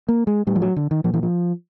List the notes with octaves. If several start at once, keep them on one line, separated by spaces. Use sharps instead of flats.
A#3
G#3
A2 G3
F3
F#3
D3
D#3
A#2 F3
E3
F3